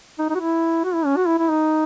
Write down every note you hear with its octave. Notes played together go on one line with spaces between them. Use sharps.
D#4
D#4
F#4
E4
F#4
E4
C#4
F#4
E4
E4
D#4